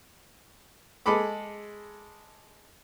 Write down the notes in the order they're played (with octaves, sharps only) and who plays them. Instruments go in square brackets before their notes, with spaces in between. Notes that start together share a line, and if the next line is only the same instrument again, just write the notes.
[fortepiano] G#3 G#4 A4 B5 D6